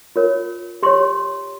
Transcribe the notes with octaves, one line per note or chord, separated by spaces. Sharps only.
F4 A#4 C#5
G4 C#5 C6